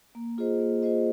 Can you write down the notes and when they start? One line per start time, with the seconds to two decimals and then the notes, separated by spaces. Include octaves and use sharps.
0.15 A#3
0.38 F4 G#4 C5 D#5
0.60 A#3
0.82 F4 G#4 C5 D#5